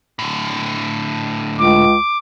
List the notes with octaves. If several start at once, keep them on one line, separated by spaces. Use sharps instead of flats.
A2 D3
C#2 D6